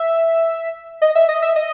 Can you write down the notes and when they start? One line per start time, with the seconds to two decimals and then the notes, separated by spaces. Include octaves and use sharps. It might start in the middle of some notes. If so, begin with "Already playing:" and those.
Already playing: E5
1.02 D#5
1.15 E5
1.29 D#5
1.42 E5
1.56 D#5